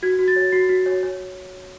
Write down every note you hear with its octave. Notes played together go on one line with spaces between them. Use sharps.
F#4 G#6
F#4
A6
C#5
F#4 C7
F#4
C#5
C#5